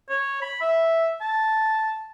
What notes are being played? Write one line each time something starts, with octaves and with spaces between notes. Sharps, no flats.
C#5
B5
E5
A5